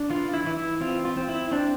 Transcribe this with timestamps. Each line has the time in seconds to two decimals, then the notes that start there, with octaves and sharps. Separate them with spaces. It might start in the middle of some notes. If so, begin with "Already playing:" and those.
Already playing: D4
0.10 E3 F4
0.34 E4
0.46 E3
0.57 E4
0.81 C4 F4
1.05 F4
1.17 C4
1.29 E4
1.51 C4 D4